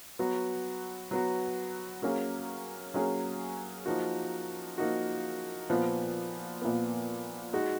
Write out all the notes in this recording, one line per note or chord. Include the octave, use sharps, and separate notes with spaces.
F#3 B3 F#4
F#3 B3 F#4
F#3 A#3 C#4 G#4
F#3 A#3 C#4 G#4
F3 A#3 D#4 F#4
F3 A#3 D#4 F#4
A#2 F3 B3
A#2 F3 B3
G#3 D#4 F#4